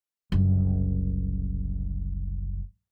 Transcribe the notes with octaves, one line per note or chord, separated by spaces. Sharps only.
F#1 C2